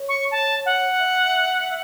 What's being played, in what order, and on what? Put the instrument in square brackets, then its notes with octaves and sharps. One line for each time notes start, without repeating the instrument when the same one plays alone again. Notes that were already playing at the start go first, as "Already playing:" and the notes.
Already playing: [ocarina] C#5
[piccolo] C#6
A5
F#5
[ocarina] E5